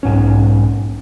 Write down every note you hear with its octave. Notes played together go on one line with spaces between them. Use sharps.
B1 G#2 C#4